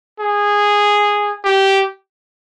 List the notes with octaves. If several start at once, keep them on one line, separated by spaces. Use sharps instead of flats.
G#4
G4